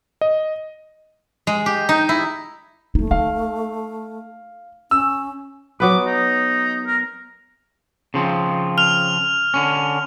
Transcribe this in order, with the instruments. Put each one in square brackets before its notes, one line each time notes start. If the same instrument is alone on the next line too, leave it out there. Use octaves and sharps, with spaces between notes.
[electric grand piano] D#5
[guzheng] G#3
G4
D#4
E4
[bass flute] A3 [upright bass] A#3 D#4
[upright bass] D#4 [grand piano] F5
[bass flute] C#4 [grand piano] E6
[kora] F#3 B3 B4 [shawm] D6
[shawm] D#4
A#4
[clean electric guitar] C#3 F3 C4
[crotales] F6 F7
[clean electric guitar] D3 C#4